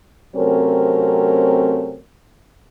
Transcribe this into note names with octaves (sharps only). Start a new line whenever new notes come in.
C3 F#3 A3 C4 C#4 A#4